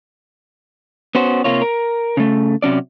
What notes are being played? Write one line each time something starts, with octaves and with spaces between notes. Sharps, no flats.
B3 C#4 F#4 C5
C3 A#3 F4 C#5
A#4
C#3 A3
C3 F#3 C#4 D5